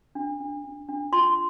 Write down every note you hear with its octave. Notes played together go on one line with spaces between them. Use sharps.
D4
D4
D4
D4
F4 C6